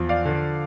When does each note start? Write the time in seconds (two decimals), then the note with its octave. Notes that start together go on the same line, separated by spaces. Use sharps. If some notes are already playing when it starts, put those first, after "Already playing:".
Already playing: E2 F3
0.09 D5 F5
0.25 D3